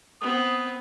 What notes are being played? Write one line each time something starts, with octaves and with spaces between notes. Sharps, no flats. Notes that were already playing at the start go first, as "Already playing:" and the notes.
B3 C4 D#6